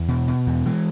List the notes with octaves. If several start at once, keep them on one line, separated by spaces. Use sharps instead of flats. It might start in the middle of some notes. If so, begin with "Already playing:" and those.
Already playing: E2
B2
B2
E2
E3 G#3